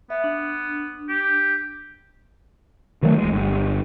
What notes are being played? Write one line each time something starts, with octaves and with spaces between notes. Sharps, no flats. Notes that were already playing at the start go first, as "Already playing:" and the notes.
B3 E5
D4
G4
D#3 E3 F#3 A3
D1 G#3
G1